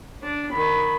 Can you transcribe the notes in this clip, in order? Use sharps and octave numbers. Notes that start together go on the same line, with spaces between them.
D4
D#3 B5